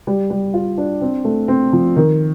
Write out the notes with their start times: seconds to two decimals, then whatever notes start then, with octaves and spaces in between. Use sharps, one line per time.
0.07 G3
0.30 G3
0.54 F4
0.78 D4
1.01 C4
1.25 A3
1.48 C4
1.73 F3
1.96 D#3